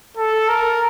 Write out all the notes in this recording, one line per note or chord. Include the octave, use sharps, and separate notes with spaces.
A4
A#4